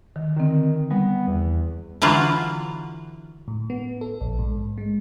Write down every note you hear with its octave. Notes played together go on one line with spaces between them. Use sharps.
D#3
D3 D#3 C4
G3 B3
E2
D3 E3 F#3 F4
A2
B3
A4
A#1
G#2
G#3